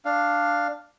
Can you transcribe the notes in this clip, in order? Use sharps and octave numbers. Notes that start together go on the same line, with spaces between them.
D4 F5